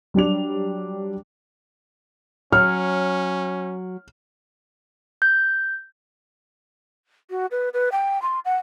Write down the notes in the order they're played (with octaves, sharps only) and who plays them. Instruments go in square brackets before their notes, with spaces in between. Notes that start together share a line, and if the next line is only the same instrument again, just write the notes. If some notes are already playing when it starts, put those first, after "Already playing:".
[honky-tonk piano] F#3 G3 D4 F7
[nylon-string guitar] F#3 [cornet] C#4 [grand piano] F6
[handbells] G6
[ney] F#4
B4
B4
G5
C6
F#5